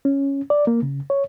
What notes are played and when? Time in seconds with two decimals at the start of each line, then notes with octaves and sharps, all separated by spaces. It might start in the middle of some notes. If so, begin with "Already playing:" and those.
0.05 C#4
0.50 D5
0.67 A#3
0.82 C#3
1.10 C#5